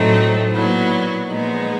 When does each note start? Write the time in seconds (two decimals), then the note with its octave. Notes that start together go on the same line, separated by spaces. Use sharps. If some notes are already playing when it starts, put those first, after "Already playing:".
Already playing: A2 F#3 A3 C4 D#4
0.52 A#2 F#3 B3 E4
1.29 A#2 F3 G#3 B3 D#4